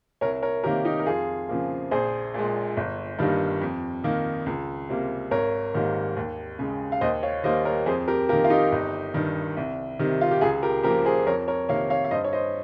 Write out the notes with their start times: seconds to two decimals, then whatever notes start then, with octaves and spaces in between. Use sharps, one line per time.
0.21 C2 A#4 C#5
0.43 A#4 C#5
0.64 C3 D#3 A#3 G4 A#4
0.85 D#4 G4
0.99 A#4
1.06 F2 F4 G#4
1.49 C#3 F3 A#3
1.91 A#1 G#4 C5
2.34 A#2 G#3
2.77 G1
3.19 G2 D#3 G3 A#3
3.62 F2
4.04 D#3 A#3
4.46 C#2
4.89 C3 G3 A#3
5.31 G#1 A#4 C#5
5.74 G#2 D#3 G3 A#3
6.17 D#2
6.59 C#3 G#3
6.92 F5
7.01 D#2 C5 D#5
7.23 C#5 F5
7.44 D#3 G3 A#3 C5 D#5
7.65 A#4 C#5
7.86 F2 G#4 C5
8.08 G4 A#4
8.29 D#3 A#3 G4 A#4
8.44 F4
8.50 D#4 G4
8.72 G1
9.14 G2 D#3
9.57 C2
9.99 C3 D#3 G3
10.21 F4
10.31 G4
10.41 C#2 F4 G#4
10.63 G4 A#4
10.83 C#3 F3 A#3 G4 A#4
11.05 G#4 C5
11.26 F2 A#4 C#5
11.48 A#4 C#5
11.69 C3 D#3 A#3 C#5 F5
11.90 C#5 F5
12.05 F5
12.11 G2 C5 D#5
12.25 C#5
12.33 C5 D#5